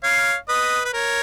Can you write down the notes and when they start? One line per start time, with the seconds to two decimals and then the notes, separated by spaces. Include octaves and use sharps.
0.03 C#5 F5
0.49 B4 D#5
0.85 B4
0.94 A#4 C#5